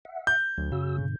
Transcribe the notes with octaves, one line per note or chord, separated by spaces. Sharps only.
E5 F#5
G6
D2 F#3
F#2 C#3 F#4 E6
G2 B2 D3